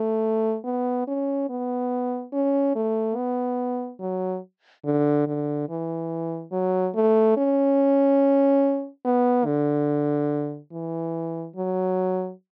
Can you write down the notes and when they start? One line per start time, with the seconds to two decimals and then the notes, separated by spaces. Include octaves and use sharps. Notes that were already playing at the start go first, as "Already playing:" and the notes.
Already playing: A3
0.65 B3
1.08 C#4
1.50 B3
2.33 C#4
2.75 A3
3.16 B3
4.00 F#3
4.85 D3
5.27 D3
5.69 E3
6.52 F#3
6.95 A3
7.37 C#4
9.05 B3
9.46 D3
10.72 E3
11.56 F#3